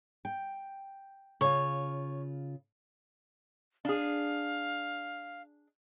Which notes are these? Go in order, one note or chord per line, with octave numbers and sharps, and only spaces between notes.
G5
C#3 F4 C#5
D4 G#4 F5